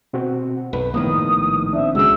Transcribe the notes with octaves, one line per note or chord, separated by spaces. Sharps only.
B2 C4 F#4
B1 F#2 B4
A#1 A2 D#3 A#3 B3 D#6
C4 D4 E5
C#2 C#3 G#3 F#4 E6